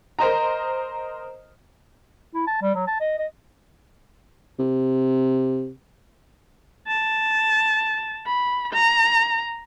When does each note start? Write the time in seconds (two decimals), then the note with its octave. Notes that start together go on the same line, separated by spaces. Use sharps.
0.19 A#4 C5 D#5 A#5
2.34 E4
2.47 A5
2.62 G3
2.75 F#3
2.87 A5
3.01 D#5
3.18 D#5
4.59 C3
6.87 A5
8.27 B5
8.73 A#5